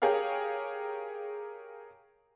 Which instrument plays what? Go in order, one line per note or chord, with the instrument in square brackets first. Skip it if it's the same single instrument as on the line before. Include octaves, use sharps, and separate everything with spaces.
[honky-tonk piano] G4 G#4 A#4 C#5 F5